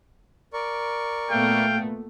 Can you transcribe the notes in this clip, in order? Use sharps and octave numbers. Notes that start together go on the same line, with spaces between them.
A#4 D5 C#6
A#2 A3 B3 F5 G5